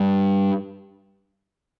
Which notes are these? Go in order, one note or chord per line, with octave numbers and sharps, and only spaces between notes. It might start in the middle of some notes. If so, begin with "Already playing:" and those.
Already playing: G2